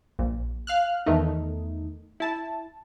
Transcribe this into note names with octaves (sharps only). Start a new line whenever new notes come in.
A#1
F5 F6 F#6
E2 D#3 A3 D#4
E4 A5